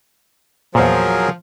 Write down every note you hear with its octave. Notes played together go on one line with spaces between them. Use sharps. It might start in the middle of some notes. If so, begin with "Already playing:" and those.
E2 A#2 F3 F#3 G#4 A#4